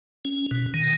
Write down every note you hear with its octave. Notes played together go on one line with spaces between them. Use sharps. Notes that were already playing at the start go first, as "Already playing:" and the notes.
C#4
B2
D#3